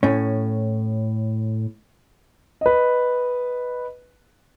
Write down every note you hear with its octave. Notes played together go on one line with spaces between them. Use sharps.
A2 C#4
B4 D#5